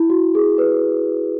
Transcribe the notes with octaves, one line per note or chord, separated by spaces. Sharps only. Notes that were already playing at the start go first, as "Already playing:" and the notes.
Already playing: E4
F#4
G#4
B4